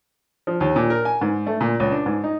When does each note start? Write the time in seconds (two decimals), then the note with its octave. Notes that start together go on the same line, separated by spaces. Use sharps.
0.47 F3
0.61 D#2
0.76 A#2
0.90 A#4
1.05 G#5
1.21 G#2
1.47 A3
1.61 A#2
1.80 C#2
1.91 D4
2.06 G#2
2.24 D#4